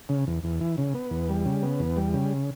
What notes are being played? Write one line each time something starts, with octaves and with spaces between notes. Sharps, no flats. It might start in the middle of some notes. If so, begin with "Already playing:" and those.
C#3
E2
E2
E3
C#3
B3
E2
G3
C#3
B3
E2
G3
C#3